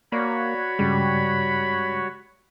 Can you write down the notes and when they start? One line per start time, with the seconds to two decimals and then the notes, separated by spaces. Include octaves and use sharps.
0.12 A#3 F#4 C#5 D5 B5
0.79 G2 C#3 G3 G#3